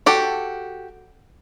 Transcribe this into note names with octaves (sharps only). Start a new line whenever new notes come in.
F#4 G4 A4